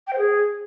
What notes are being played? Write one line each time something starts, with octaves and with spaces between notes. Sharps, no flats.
G5
C5
G#4